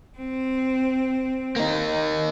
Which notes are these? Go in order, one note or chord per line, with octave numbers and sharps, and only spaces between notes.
C4
A#3 D#4